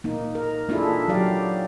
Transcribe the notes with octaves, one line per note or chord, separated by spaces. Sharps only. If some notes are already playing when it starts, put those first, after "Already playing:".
A#3 D#4
A#4
A#3 D4 E4 F4 G#4 A4
F#3 G4 D5 F5